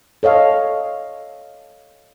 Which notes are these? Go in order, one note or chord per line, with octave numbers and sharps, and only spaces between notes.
A4 C#5 D#5 F5